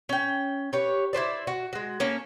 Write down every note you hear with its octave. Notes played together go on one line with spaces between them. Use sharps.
C#4 G5
G4 B4 C#5
E4 G4 C5 D5
F#4
G#3 F#4
A#3 C#4 A4